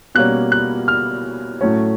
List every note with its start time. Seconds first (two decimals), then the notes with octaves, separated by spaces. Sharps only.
0.15 B2 G3 A#3 C#4 F#6
0.52 F#6
0.88 F6
1.61 A2 F#3 A3 C#4